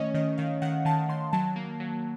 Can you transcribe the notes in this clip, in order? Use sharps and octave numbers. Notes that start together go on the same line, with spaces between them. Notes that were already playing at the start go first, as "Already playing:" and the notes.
Already playing: D#3 A3 C#4 C#5 D#5
D#3 D#5
D#3 F5
D#3 F#5
D#3 A5
D#3 C6
F#3 A5
A#3
F#3